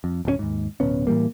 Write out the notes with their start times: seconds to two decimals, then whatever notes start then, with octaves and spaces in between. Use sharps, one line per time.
0.04 F2
0.25 D1 F#2 F#3 C#4
0.39 D#2 G#2
0.80 D1 B2 B3 C#4
1.07 A2 E3 G3 A#3